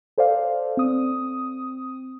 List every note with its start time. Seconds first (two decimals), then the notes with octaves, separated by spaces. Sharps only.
0.18 A4 C5 D5 F5
0.77 C4 D#6